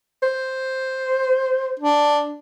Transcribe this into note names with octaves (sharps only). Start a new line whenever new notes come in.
C5
D4